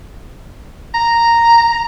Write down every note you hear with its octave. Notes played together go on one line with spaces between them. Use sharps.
A#5